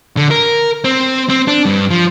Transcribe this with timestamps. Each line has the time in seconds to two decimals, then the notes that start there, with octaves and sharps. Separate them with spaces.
0.17 D3
0.31 A#4
0.84 C4
1.29 C4
1.48 D4
1.65 G2
1.90 F3